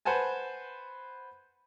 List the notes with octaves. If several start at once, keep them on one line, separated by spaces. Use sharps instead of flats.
B4 C5 F#5 G#5 A5